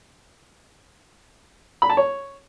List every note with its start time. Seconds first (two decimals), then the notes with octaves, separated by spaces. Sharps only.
1.82 B5
1.90 A5
1.97 C#5